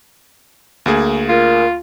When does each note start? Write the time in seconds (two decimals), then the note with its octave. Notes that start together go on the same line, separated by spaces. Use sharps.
0.86 D2 A#3 G#4
1.29 F4 A#4